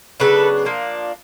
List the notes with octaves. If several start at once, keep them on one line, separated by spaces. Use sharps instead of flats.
C#3 F#3 B3 D4 A4 B4
F3 A#3 D4